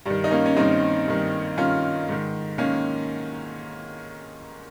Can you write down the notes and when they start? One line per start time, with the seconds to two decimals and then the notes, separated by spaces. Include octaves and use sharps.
0.06 G2 G3
0.10 D#3
0.24 D#4
0.31 A#3 C#4
0.46 C#4
0.56 G2 D#3 C4 D#4
1.08 G2 D#3
1.57 G2 D#3 C#4 F4
2.09 G#2 D#3
2.58 D#3 A#3 C#4